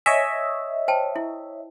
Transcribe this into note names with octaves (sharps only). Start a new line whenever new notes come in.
C#5 D#5 E5 G#5
C5 G5 A5
E4